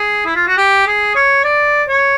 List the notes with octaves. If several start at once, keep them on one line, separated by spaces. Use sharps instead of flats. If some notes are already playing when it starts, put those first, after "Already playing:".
Already playing: G#4
E4
F4
F#4
G4
G#4
C#5
D5
C#5